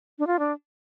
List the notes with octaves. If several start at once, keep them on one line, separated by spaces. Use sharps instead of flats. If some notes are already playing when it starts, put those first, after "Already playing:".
D4
F4
D4